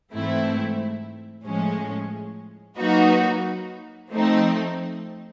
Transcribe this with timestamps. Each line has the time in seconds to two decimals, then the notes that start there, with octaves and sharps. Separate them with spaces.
0.13 G#2 E3 A3 C4 E4
1.45 A2 F3 G#3 C#4
2.78 F#3 A#3 D#4 F#4 B4
4.10 F3 A3 C4 D#4